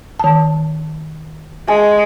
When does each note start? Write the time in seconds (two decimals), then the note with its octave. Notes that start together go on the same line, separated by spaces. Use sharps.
0.20 D#3 A5
1.68 G#3 G#5